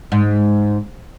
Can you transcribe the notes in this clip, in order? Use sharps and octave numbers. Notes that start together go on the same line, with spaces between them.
G#2